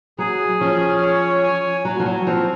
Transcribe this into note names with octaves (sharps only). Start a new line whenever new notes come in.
F#3 G#4
F3 C#4
C#5
G#5
F#3 F#4
F3
F#3
F3 C4